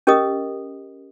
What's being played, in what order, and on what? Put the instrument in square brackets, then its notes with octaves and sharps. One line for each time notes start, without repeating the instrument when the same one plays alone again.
[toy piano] C#4 G4 A#4 D#5 D#6